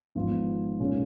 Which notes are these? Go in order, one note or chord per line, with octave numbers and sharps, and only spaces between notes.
G#1 G#2 F3 B3 F4
B1 A#2 G#3 C#4